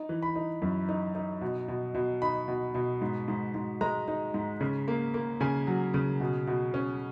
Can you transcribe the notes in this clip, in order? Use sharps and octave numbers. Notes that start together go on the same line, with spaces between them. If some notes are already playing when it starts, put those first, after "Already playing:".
Already playing: D#4
E3
B5
D#4
F#2
D#4
D#4
B2
B2
B2
D#4 B5
B2
B2
G#2
G#2
G#2
G#3 A#5
D#4
G#2
C#3
A#3
A#3
C#3 G#5
F#3
C#3
B2
B2
C#4